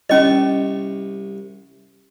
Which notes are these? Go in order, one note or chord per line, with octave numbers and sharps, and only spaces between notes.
C2 C#4 D#5 C#6